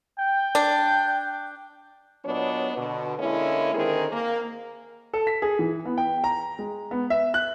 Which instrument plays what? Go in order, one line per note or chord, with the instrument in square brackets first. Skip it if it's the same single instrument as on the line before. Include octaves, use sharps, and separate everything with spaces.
[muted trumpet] G5
[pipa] D4
[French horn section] A#2 F#3 B3 D4 C#5 D#5
B2 D3
D3 G#3 A#3 C#4 E4
D3 D#3 C4 G#4 A#4
A#3
[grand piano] A4
B6
G#4
E3
B3
G5
A#5
G#3
B3
E5
F#6